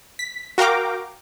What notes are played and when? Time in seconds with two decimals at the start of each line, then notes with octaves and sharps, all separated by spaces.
0.19 B6
0.58 F#4 A#4 F5 G5 A#5 D6